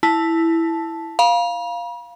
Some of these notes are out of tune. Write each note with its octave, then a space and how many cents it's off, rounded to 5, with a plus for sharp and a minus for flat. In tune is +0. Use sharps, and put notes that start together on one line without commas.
E4 +0 A5 -5
F5 +0 B5 -45